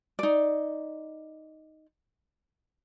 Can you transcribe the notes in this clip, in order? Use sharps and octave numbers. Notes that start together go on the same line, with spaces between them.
D#4 D5